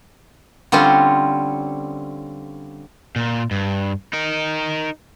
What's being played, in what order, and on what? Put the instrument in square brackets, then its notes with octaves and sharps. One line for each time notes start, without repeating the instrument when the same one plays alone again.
[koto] D3 G3 C4 C#4 F4
[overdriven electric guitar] A#2
G2
D#4 A#4